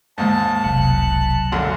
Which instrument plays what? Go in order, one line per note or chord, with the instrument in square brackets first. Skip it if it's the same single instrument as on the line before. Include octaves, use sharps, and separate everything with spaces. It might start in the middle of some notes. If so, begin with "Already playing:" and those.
[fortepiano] D#2 G#2 [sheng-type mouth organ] A5
[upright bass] F1 C2 [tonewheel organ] B2 F#3
[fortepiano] G#1 F#2 D3